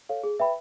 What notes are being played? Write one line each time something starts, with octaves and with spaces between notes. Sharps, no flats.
A4 C#5 F5
G#4
B4 E5 G5 B5